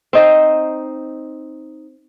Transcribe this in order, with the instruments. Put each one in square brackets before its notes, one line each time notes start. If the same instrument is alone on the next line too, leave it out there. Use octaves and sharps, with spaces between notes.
[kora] C4 D#4 C5